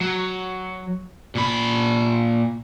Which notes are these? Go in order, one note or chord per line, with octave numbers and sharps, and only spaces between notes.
F#3
A#2 B5